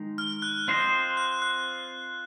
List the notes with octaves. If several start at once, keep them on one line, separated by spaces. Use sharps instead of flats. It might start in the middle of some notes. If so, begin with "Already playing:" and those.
Already playing: D#3 G#3 D#4
F6
F#6
C4 F4 C5 D#5
F#6
F#6